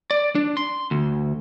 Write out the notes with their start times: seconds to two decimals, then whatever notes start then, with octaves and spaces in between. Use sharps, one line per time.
0.11 D5
0.35 D4
0.57 C6
0.91 D2